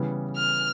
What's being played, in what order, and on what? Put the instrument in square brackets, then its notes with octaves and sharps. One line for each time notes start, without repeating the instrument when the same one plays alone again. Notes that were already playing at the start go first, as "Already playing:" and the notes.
Already playing: [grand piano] C#3 E3 G3 B3
[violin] F6